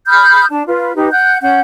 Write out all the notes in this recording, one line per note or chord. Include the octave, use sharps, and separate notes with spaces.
B5 D#6 F6 G6
D4 A5
F4 B4
D#4 G4 B4
F#5 F#6 G6
C#4 F#5 G6